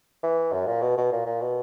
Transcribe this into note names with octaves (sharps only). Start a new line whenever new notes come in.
E3
F#2
A#2
B2
B2
A#2
A#2
B2